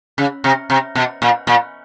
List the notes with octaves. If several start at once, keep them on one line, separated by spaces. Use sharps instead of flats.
C#3
C3
C3
B2
A#2
A#2